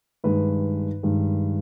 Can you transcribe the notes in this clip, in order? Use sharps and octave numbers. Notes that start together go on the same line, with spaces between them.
G2 D#3 G#3 B4
G2 D#3 G#3